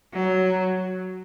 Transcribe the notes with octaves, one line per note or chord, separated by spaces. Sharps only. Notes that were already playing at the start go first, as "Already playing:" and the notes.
F#3